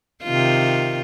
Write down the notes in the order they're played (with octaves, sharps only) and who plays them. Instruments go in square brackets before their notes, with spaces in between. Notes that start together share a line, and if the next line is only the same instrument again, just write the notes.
[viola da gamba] C3 D#3 F4